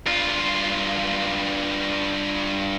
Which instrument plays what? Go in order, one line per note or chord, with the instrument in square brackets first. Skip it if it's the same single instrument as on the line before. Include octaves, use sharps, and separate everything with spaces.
[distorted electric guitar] G2 F4